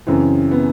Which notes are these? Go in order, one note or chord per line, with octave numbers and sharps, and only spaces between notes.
F#2 C#3 E3 C4
B3